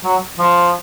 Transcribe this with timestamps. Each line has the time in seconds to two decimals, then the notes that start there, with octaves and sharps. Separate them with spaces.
0.04 F#3
0.39 F3